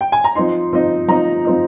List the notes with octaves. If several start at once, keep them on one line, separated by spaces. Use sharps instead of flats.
G5
G#5
A#5
F3 C4 D#4 C6
F3 C4 D#4
F3 C4 D#4 A#5
F3 C4 D#4